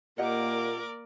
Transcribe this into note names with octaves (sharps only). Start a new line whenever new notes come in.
A#2 A#3 G4 A#4 D5 D#5 F#5 D6